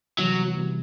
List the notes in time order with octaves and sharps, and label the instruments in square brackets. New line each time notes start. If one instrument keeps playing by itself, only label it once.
[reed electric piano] C3 E3 G3 B3 E4 [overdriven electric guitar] F#3
[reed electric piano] C3 E3 G3 B3 E4